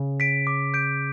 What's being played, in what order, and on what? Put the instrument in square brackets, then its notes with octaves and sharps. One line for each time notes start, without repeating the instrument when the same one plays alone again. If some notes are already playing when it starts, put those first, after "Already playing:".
Already playing: [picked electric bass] C#3
[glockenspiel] B6 D7
D6
G6 D7